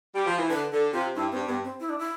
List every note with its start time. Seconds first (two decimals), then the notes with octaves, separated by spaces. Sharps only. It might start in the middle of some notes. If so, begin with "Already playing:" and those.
0.15 G3
0.26 F3
0.38 E3
0.50 D3 B4
0.72 D3 A4
0.93 C3 F4
1.15 G2 E4
1.31 G2 C4
1.47 G2 B3
1.64 C4
1.80 E4
1.89 D4
1.99 E4